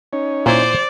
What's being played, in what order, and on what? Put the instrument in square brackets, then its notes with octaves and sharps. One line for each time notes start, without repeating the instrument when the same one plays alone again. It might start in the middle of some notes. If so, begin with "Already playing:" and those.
[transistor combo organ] C#4 D#4 C#5
[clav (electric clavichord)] A#2 E4 [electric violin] C5 [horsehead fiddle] D5